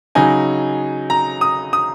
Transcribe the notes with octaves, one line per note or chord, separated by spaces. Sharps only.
C#3 F#3 D#4 G#5
A#5
D#6
D#6